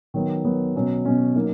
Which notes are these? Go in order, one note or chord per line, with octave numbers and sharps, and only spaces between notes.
D#3 F#3 B3
D#3 F#3 B3
B2 F#3 C#4
B2 F#3 C#4
F#3 A#3 D#4